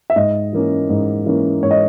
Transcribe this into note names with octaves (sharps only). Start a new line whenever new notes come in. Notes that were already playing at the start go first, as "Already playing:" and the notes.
E5
G#2 D#5
E3 A#3 C#4
G#2
E3 A#3 C#4
G#2 C#5
D#5